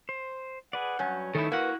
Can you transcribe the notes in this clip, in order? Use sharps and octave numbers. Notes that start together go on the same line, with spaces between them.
C5
G#4 B4 D5 F#5
G2 F#3 C#4 G6
D#3 A3 D#4 E4 A4
A#3 E4 F#4 B4 F#5